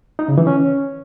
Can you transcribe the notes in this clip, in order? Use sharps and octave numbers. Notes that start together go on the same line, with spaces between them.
D#4
C#3
E3
C#4